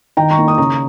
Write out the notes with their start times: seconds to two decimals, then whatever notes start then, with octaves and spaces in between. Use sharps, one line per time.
0.17 D#3 G5 A#5
0.31 A#5 C#6
0.38 A#3 D#4
0.48 D#6
0.58 C#3 A#5 C#6